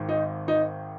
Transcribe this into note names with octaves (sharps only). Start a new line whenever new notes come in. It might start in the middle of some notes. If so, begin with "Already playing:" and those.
Already playing: G#1 G#2 D#3
D#4
D#4